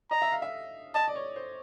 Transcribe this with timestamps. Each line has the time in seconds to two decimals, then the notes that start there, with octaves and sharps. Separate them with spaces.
0.11 D#5 A#5
0.22 E5
0.32 F5
0.42 E5
0.94 D#5 A5
1.08 D5
1.15 C#5
1.36 C5